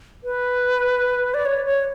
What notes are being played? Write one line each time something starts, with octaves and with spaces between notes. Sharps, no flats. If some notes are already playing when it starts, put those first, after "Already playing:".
B4
D5
C#5
C#5